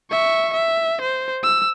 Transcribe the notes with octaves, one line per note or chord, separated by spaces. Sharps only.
E5 C#6
E5
C5
E6